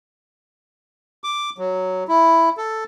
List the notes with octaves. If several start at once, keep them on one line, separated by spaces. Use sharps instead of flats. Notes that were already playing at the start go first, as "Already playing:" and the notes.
D6
F#3
E4
A4